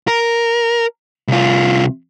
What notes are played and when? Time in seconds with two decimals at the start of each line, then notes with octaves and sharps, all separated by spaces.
0.08 A#4
1.28 C2 F4